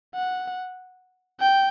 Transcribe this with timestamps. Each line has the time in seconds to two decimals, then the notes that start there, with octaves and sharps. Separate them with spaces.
0.15 F#5
1.40 G5